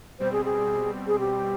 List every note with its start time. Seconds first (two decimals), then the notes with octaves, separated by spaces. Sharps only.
0.20 B2 G3 C4 C5
0.32 G#4
0.45 G#4
1.07 G#4
1.19 G4